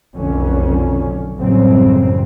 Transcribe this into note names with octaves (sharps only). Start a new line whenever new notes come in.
F1 B1 F2 D3 C#4
A1 F#2 C#3 F#3 G3 C4